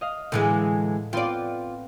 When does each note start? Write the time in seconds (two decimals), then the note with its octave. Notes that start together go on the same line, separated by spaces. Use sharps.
0.01 D#5 F5
0.32 A2 D3 E3 G#3
1.13 B3 C4 F4 D5 G5